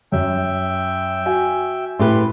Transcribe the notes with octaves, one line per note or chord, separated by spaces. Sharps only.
F#2 E5 G5
F#4 G#5
A2 G4 B4 E5 C6